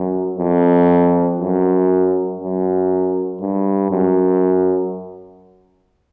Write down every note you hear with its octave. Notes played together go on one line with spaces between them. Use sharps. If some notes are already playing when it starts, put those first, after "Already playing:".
Already playing: F#2
F2
F#2
F#2
G2
F#2